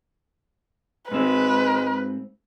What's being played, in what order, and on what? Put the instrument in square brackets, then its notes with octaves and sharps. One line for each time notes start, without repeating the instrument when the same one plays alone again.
[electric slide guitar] G#2 C4 [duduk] G#3 [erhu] B4